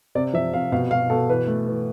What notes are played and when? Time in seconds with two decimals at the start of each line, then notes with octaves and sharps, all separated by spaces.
0.15 C3 D5
0.34 F3 E5
0.54 C3 F5
0.72 B2 F5
0.91 B2 F5
1.10 B2 A4
1.29 E3 B4
1.47 A3
1.67 E3